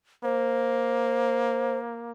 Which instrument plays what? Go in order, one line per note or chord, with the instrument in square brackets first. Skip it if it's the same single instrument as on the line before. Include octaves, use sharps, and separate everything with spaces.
[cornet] A#3 [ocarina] C5